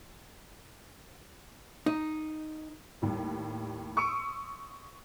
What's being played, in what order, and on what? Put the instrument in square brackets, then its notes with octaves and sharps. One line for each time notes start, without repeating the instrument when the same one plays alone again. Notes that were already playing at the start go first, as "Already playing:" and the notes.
[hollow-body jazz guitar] D#4
[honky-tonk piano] D#2 A2 G3
C6 C#6 D#6 E6 C#7 D7